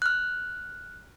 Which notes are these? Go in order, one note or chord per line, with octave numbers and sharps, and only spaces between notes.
F6 F#6